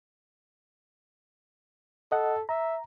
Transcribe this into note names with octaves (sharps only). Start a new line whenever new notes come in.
A4 D#5 F#5
E5 A#5